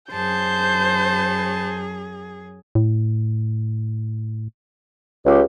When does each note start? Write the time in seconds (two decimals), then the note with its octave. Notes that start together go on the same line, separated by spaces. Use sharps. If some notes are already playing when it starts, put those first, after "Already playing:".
0.12 F#2 G#4 C5 A5 G6
2.75 A2
5.26 C#2 G4